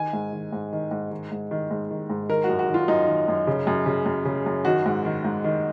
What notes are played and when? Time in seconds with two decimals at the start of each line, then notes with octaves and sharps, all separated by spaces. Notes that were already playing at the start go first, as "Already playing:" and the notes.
Already playing: D#3 G#5
0.13 G#2
0.33 D#3
0.52 G#2
0.73 D#3
0.91 G#2
1.11 D#3
1.32 G#2
1.51 D#3
1.70 G#2
1.91 D#3
2.09 G#2
2.29 D#3 A#4
2.44 F#4
2.50 F#2
2.59 F#4
2.69 D#3
2.74 F4
2.88 F#2 D#4
3.07 D#3
3.28 F#2
3.47 C#3
3.67 F#2
3.86 C#3
4.06 F#2
4.25 C#3
4.46 F#2
4.65 D#3 F#4
4.85 G#2
5.05 D#3
5.24 G#2
5.44 D#3